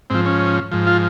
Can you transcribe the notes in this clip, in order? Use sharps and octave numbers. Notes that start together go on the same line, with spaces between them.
G#2 F3 C4
C#4
G#2 F3
F4